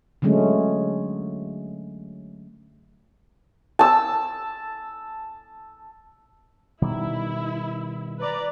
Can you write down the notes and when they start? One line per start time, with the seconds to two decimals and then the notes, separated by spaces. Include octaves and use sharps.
0.22 D3 F#3 G#3 A3 C#4
3.79 A5 E6
6.82 B2 D#3 G3 E4
8.20 B4 D5 A#5